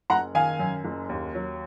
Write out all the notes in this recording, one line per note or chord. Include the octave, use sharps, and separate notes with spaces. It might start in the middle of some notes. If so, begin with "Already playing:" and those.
F#1 F#5 A#5
D#3 F5 G#5
F#2
F#1
D#2
F#3